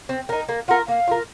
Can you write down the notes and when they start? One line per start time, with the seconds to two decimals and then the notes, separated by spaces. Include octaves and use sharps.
0.09 C4
0.29 D#4 A#4
0.49 A#3
0.68 F4 A#4 F#5
0.88 A#3 F5
1.07 F4 A#4